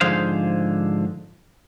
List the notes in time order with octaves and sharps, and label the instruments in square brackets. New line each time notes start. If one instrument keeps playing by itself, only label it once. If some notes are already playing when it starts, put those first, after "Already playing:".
[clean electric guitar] G#2 D3 F3 G#4 C5 F5